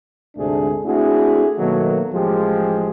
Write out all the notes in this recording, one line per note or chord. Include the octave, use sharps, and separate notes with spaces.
D2 G#2 C3 A3 D4 G#4
A3 C4 D4 E4 F#4 G#4
B2 D#3 F#3 A3 A#3
A1 F3 G#3 G4